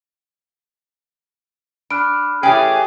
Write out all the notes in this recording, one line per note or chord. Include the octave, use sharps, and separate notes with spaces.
D4 B5 F6 F#6 D7
E3 A3 C#4 G4 G#4 G5